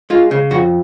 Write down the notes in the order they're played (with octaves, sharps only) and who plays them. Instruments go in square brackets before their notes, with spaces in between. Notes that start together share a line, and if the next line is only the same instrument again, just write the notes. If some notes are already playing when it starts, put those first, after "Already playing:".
[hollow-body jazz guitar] G#3 F4
C#3
F2 F#4